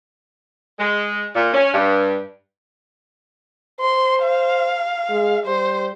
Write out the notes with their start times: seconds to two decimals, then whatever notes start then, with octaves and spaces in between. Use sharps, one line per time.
0.80 G#3
1.35 A#2
1.54 C#4
1.73 G2
3.80 C5 C6
4.23 F5
5.10 G#3
5.46 G3 C5